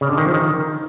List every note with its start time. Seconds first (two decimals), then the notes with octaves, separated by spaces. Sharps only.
0.01 C#3
0.09 D3
0.18 D#3
0.26 F3
0.34 D#3